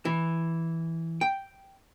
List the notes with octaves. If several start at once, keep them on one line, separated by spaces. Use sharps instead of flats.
E3
G5